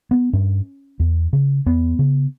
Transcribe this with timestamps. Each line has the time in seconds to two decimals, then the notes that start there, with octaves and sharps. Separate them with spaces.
0.11 B3
0.33 G2 C#4
1.00 E2
1.33 C#3
1.66 E2 B3
1.99 C#3